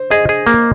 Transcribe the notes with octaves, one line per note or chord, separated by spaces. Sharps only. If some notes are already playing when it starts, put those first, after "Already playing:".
Already playing: C5
G#4 D#5
G#4
A#3